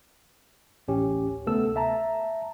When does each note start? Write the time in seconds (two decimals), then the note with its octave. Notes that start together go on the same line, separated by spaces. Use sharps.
0.88 A1 D2 C#4 G4
1.46 D2 C3 A3 B3 A4 E6
1.76 E5 A5 A#5